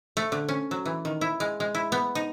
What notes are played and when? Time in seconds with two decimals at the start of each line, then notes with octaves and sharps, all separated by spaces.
0.17 A3
0.32 D3
0.49 C#4
0.71 F#3
0.85 E3
1.05 D#3
1.21 E4
1.40 G#3
1.60 G#3
1.75 E4
1.92 B3
2.15 D#4